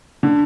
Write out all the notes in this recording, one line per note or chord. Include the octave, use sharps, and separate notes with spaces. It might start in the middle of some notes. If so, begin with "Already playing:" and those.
D3